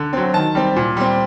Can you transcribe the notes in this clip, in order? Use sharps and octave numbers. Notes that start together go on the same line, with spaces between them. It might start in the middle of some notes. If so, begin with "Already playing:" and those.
Already playing: D3
F#3 C4
D#3 A5
G3 C4
A#2
G3 C4